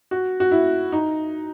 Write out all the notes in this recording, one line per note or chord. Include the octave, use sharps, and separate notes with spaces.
F#4
F#4
E4
D#4